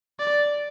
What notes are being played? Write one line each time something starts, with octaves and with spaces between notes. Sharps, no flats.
D5